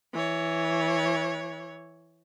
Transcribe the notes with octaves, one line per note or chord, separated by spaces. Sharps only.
E3 C#5